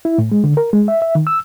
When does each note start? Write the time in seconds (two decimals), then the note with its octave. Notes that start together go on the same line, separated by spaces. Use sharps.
0.05 E4
0.18 A2
0.32 G#3
0.44 D3
0.57 A#4
0.73 G#3
0.88 E5
1.02 E5
1.15 D#3
1.27 E6